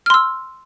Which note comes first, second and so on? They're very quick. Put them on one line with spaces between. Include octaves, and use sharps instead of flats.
F6 C6 E6